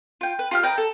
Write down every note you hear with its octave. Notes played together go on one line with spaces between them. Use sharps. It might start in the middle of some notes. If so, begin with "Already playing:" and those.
F4 G5
B4
F4 G4 F6
B4 D#5 G5 A#5
A4